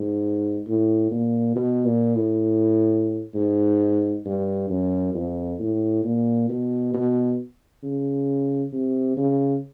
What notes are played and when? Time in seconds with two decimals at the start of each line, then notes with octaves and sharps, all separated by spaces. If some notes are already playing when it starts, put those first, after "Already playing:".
Already playing: G#2
0.68 A2
1.11 A#2
1.56 B2
1.86 A#2
2.16 A2
3.35 G#2
4.26 G2
4.70 F#2
5.14 F2
5.60 A2
6.04 A#2
6.49 B2
6.94 B2
7.83 C#3
8.73 C3
9.17 C#3